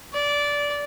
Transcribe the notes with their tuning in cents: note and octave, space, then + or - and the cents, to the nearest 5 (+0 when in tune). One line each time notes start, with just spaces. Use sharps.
D5 -15